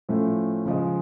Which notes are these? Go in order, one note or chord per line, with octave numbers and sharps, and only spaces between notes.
A2 F3 A3 C#4
C#3 F3 G#3